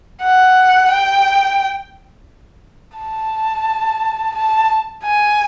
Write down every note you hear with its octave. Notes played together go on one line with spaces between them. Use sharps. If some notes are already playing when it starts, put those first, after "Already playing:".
F#5
G5
A5
A5
G#5